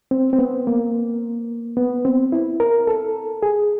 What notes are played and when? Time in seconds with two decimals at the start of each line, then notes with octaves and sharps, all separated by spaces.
0.11 C4
0.33 C4
0.39 B3
0.67 A#3
1.77 B3
2.05 C4
2.32 E4
2.60 A#4
2.87 A4
3.43 G#4